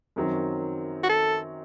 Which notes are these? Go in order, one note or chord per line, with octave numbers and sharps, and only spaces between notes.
F#2 D#3 F#3 C4
F#4
A4